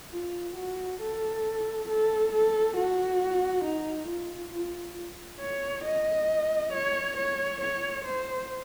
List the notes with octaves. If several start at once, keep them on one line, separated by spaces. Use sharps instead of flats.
F4
F#4
A4
A4
A4
F#4
D#4
F4
F4
C#5
D#5
C#5
C#5
C#5
C5